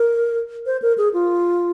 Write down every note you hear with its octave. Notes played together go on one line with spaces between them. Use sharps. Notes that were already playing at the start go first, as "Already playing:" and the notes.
Already playing: A#4
C5
A#4
G#4
F4